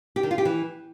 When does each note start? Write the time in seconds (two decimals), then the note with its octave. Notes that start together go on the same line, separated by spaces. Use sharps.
0.16 G4
0.23 D#3
0.31 F4
0.38 G4
0.45 E3